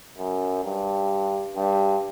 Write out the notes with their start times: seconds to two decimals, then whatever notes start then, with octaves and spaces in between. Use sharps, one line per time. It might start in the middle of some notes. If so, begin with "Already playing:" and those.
0.18 F#2
0.64 G2
1.56 G2